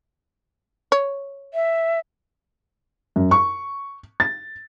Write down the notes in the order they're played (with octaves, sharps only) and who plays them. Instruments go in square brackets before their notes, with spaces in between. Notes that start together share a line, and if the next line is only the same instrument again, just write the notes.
[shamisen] C#5
[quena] E5
[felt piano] F#2
C#6
A6